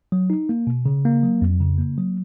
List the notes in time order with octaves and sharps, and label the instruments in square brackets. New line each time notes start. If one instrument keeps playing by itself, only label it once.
[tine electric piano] F#3
D#4
A#3
B2
C#3
A#3
F#3
F2
C#3
A#3
F#3